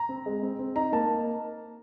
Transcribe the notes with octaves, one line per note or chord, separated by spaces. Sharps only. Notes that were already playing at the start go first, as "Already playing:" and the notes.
Already playing: A#5
C4
G#3
C4
C4
D#4 A#5
A#3 A5